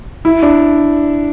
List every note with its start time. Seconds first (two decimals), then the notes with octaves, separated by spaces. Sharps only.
0.25 E4
0.43 D4